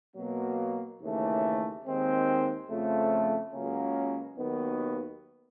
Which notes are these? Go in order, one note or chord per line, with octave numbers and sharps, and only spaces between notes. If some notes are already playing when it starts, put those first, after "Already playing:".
B2 F#3 A#3
D#2 C#3 E3 A3
D#2 D#3 G#3 C4
F2 C#3 F3 A3
C#2 C#3 F#3 A#3 C#4
D#2 D#3 F#3 B3